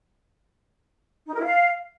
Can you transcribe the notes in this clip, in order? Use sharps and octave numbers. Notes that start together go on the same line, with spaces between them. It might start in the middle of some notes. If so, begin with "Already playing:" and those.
D#4
A#4
E4
F5